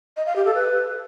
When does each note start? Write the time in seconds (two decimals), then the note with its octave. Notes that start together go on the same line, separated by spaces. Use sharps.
0.17 D#5
0.26 F5
0.36 G4
0.45 A4
0.55 B4